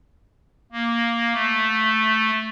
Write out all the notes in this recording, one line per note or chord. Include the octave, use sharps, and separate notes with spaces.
A#3
A3